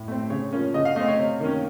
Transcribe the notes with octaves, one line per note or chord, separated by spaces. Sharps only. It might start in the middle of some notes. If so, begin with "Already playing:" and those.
Already playing: A2
A3 C4
C#3 C#5
F3 A#3 C#4
C#3 D#5
F5
A3 C4 D#5
C#5
C3
D#3 A#3 C#4